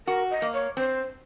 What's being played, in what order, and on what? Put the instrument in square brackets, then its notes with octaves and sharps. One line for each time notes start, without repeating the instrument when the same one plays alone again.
[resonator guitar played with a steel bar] F#4 [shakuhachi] A#4
[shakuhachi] D#5
[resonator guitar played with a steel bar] A#3
[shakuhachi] C#5
[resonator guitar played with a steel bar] C4 [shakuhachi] C5